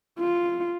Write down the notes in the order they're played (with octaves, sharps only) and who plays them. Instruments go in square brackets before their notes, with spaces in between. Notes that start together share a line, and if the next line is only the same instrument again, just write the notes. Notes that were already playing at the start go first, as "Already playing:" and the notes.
[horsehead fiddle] F4